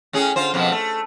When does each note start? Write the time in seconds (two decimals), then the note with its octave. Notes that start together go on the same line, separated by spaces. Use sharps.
0.13 A2 C#4 G#4
0.36 D3 F4 C5
0.54 F2 B2 F3
0.72 A3